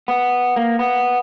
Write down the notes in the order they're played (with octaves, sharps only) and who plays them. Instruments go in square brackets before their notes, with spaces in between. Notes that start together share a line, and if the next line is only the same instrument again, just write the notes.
[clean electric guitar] B3
A#3
B3